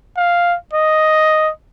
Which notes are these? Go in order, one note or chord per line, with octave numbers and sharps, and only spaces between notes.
F5
D#5